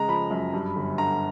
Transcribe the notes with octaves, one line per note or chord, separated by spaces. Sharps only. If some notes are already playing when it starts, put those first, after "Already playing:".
Already playing: C#3 G#3 A#5
F3 B5
F#2
G2
G1
D3 A#5